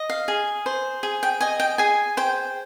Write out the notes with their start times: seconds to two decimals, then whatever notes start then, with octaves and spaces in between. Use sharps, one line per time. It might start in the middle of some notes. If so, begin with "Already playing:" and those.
Already playing: D#5
0.10 F5
0.28 G#4
0.66 C5
1.03 G#4
1.23 G5
1.40 D#5 G#5
1.60 G5
1.78 G#4 G#5
2.17 C5 G5